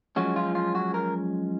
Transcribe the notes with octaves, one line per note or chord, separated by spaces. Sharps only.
F#2 F3 G#3 C#4 F#4
F4
F4
F#4
A#4